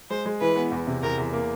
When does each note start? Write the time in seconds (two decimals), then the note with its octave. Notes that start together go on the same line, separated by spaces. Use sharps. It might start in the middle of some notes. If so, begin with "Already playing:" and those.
0.10 G#3 C5
0.26 G#3
0.41 E3 B4
0.56 B3
0.72 E2
0.87 C3
1.03 E2 A#4
1.18 E2
1.33 A#3